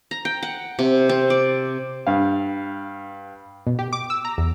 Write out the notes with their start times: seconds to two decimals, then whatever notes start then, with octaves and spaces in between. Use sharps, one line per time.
0.11 A#5
0.25 G5
0.43 F#5
0.79 C3
1.09 C4
1.30 D5
2.07 G2 F5
3.67 B2
3.79 G4
3.93 D6
4.10 E6
4.25 A#5
4.38 E2